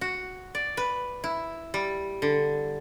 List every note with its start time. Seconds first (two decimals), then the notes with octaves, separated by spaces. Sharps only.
0.01 F#4
0.55 D5
0.77 B4
1.24 E4
1.74 G3
2.22 D3